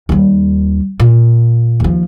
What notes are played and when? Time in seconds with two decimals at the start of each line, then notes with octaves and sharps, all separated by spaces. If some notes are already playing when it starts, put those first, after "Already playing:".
0.09 D#2 G3
1.00 A#2
1.80 D#2 F3